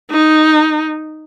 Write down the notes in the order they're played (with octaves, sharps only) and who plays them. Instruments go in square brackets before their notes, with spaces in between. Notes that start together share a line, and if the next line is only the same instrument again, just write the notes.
[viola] D#4